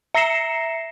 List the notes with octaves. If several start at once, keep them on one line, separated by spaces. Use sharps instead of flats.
E5 A#5 A#6 C7 C#7 E7